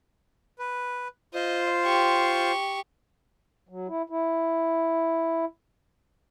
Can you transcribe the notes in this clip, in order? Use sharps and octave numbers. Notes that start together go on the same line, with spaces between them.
B4
F4 C5 D#5
G4 C#6
F#3
E4
E4